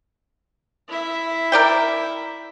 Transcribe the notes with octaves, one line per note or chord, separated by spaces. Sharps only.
E4 E5
A#4 D5 G5